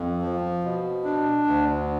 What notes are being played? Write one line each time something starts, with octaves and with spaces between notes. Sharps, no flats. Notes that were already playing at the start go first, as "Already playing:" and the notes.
Already playing: F2
F3
B2
D4
D2